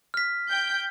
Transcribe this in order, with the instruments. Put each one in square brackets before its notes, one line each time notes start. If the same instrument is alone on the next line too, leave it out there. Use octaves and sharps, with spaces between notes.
[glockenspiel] F6 B6
[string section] G5 G6